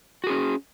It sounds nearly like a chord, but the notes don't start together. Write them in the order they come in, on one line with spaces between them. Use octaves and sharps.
F#4 G#4 C#4